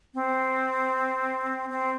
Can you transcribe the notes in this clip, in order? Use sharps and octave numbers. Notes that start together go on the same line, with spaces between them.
C4
C4